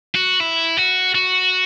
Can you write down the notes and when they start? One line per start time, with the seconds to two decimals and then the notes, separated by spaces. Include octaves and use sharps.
0.15 F#4
0.41 E4
0.77 F#4
1.15 F#4